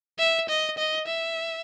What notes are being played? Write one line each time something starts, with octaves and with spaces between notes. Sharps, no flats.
E5
D#5
D#5
E5